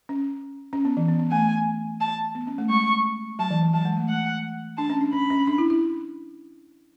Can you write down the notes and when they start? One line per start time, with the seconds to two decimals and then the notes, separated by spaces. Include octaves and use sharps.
0.09 C#4
0.73 C#4
0.85 B3
0.97 E3
1.08 B3
1.19 B3
1.31 A3 G#5
2.01 A5
2.35 B3
2.47 C#4
2.58 A3
2.70 G#3 C#6
3.39 F#3 A5
3.51 E3
3.63 E3
3.73 F#3 A5
3.85 G#3
3.97 A3
4.09 F#5
4.78 D4 A5
4.90 C#4
5.01 D4
5.13 C#4 B5
5.30 C#4
5.47 D4
5.58 E4
5.70 E4